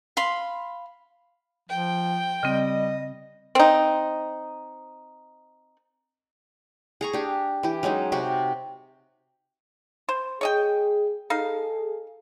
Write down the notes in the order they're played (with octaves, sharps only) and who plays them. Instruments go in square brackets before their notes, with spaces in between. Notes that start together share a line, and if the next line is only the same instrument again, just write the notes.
[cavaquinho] F5 B5 C6
[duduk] F3 [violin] G5
[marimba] C#3 C4 [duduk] G3 [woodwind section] D#5
[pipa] C4 D#4
[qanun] G#4 A#5 C#6
D4 G4
E3 G4
F#3 G#3 C#4 D#4
C3 F#4 G4
[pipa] C5
[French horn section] G#4 [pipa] C#5 D#5 G5
[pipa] D#4 F5 [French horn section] G#4 A4